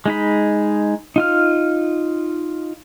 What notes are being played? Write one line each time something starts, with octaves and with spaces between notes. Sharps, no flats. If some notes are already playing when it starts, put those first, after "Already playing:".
G#3 D#4 B5
D#4 F4 F6